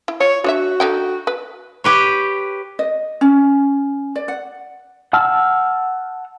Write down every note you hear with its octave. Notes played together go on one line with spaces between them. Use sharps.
E4
F4 C#5
D4 F#4 C#5 E5
D3 D#4 G5
B4
G4 B4 C#5
D#5
C#4
D5
F#5
F#5 A5 E6 F6